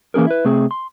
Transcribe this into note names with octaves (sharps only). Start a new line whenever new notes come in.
E3 A#3 C#4 G#4 A#4
E4 B4
C3 A3 C4 G#4
C6